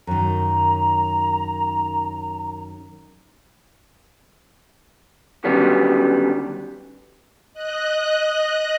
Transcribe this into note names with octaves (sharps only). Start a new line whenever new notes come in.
F#2 D#3 A#5
D3 D#3 F#3 G3 B3 C#4
D#5 F#6